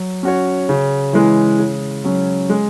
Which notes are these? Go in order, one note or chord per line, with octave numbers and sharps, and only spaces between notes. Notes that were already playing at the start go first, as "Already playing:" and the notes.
Already playing: F#3
C#4 F#4 C#5
C#3
E3 G#3
C#3
F#3 C#4
G#3